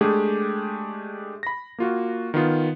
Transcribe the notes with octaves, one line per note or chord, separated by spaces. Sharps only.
G#3 A3 D4 G4 G#4
B5 A#6
A#3 F4 F#4
D#3 B3 F4